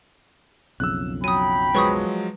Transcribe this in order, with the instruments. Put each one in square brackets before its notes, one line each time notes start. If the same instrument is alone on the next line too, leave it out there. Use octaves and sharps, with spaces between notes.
[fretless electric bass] B1 F2 C#3 [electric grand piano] E6 F#6
[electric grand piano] F#3 [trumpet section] G5 B5 [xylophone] D#6 D#7
[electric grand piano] F3 F#3 G#3 [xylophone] B4 C#6 D#6